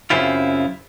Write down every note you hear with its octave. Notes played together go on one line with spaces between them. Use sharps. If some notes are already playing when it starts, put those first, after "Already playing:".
F#2 A#2 C#3 C4 E4 F4